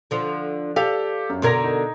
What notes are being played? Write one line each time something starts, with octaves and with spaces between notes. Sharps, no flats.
D3 F3
G4 A4 D5 F5
F#2
B2 D3 A#4 C6 G#6 A#6
D#4